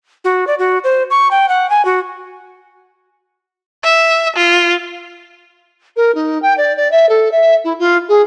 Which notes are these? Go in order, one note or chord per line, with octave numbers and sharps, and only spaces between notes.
F#4
D5
F#4
C5
C#6
G5
F#5
G#5
F#4
E5
F4
A#4
D#4
G5
D5
D5
E5
A4
E5
E4
F4
G#4